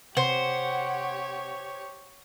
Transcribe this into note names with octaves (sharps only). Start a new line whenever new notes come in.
C3 G4 C5 C#5 F#5